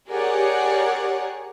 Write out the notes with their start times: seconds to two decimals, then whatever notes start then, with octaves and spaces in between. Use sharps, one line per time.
0.11 G4 G#4 A#4 C#5 D5 F#5